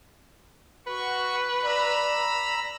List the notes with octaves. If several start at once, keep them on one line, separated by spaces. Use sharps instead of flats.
F#4 B4 C#6
D5 A#5 B5 E6